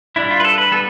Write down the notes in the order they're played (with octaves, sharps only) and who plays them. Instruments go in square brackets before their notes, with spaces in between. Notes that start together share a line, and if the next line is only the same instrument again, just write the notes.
[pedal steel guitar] G3 D4 E4
F4
B4
A4
B4
G3 B3 A4